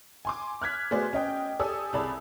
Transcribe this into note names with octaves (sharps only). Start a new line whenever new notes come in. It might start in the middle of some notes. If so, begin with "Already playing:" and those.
G#5 C6 D6
F6 F#6 G#6 B6
A3 B3 F#4 G#4 C5 D5
C#4 D#5 G5
G4 A4 D5 G#5 D#6 E6
C2 G#4 D5 A5 B5